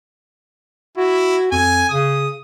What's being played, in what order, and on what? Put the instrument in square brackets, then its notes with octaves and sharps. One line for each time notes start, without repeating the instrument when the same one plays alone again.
[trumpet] E4 [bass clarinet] F#4
[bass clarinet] F2 [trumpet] G#5
[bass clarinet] C#3 [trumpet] D#6